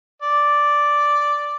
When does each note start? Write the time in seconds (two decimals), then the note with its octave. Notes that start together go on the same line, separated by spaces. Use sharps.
0.22 D5